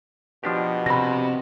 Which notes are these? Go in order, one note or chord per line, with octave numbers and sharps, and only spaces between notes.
B2 F3 D4 G4
C3 B5 A#6